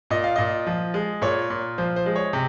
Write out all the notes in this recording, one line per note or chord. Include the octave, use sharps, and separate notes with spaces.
A#2 D#5
F5
A#2 D#5
F3
G#3
A#2 C#5
A#2
F3 C5
C5
G#3
C#5
C3